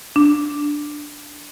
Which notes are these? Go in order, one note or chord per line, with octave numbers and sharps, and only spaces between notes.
D4